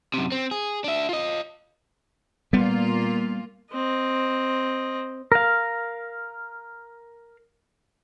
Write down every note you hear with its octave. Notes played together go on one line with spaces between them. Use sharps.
F#2 C3
C4
G#4
D4 E5
F4 D#5
A#2 G3 A#3 B3 F4
C4 D#5
A#4 F5